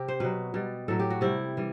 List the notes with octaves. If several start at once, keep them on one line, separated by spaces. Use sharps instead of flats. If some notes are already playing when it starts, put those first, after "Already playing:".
Already playing: C3 G4
C5
B2 F#3 B4
B2 G3
A2 F#3 A4
G4
F#4
C3 G3 E4
E3 G3